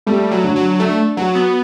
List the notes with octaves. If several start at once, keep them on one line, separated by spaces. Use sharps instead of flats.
G3 A3
F#3
D3
F#3
A3 D4
F#3 F#4
B3